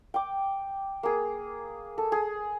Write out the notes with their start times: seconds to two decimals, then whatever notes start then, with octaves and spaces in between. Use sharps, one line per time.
0.14 G5 D6
1.03 A#3 G#4
1.98 A4
2.12 G#4